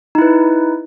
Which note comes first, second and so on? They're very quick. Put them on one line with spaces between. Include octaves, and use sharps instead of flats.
D#4 E4 B4